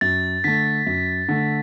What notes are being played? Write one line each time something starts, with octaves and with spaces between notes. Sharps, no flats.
F#2 A6
D3 A3 B6
F#2
D3 A3